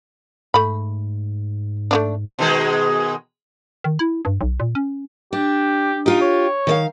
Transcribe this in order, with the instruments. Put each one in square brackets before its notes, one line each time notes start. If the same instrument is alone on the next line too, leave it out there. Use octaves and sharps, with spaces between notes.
[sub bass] G#2 [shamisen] A3 B5
[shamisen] A3 C#4 D4
[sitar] B2 D#3 G#3
[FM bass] D#3
E4
G2
B1
A#2
C#4
[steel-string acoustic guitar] D4 [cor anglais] G4
[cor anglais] D#4 [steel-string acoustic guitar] F4 G4
[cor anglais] C#5
[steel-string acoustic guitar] D#3 D5 F5